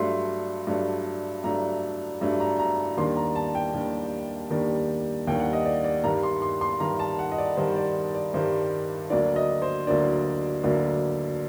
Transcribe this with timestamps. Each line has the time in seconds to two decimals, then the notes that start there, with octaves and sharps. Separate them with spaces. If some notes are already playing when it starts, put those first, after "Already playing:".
Already playing: G2 F#3 A3 D4 C6
0.67 G2 F#3 A3 D4
1.44 G2 F#3 A3 D4 A#5
2.21 G2 F#3 A3 D4
2.40 A#5
2.59 A#5
2.97 D#2 D#3 G3 D4 C6
3.16 A#5
3.35 A5
3.55 G5
3.74 D#2 D#3 G3 D4
4.50 D#2 D#3 G3 D4
5.27 D#2 D#3 G3 D4 G5
5.40 F#5
5.53 D#5
5.65 D5
5.84 D5
6.04 G2 D#3 G3 A#5
6.23 C6
6.42 C6
6.61 C6
6.80 G2 D#3 G3 A#5
6.99 A5
7.19 F#5
7.32 D#5
7.38 D5
7.57 G2 D#3 G3 C5
7.76 D5
8.15 D5
8.34 G2 D#3 G3 C5
9.10 D2 D3 F#3 A#3 D4 D5
9.36 D#5
9.62 C5
9.87 D2 D3 F#3 A#3 D4 D5
10.64 D2 D3 F#3 A#3 D4